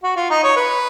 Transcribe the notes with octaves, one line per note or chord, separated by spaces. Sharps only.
F#4
F4
D#4
C#5
B4